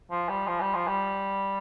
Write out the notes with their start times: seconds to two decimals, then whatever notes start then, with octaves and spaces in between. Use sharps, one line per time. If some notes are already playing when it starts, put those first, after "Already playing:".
0.11 F3
0.29 G3
0.47 F3
0.61 G3
0.75 F3
0.87 G3